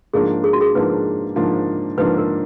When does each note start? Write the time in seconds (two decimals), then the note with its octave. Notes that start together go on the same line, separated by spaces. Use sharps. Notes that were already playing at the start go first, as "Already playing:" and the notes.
0.14 G#2 F3 A#3 D4 G#4
0.44 G#4
0.53 F#4
0.61 G#4
0.75 G#2 F3 A#3 D4 B4
1.36 G#2 F3 A#3 D4
1.98 G#2 F3 A#3 D4 B4
2.18 A#4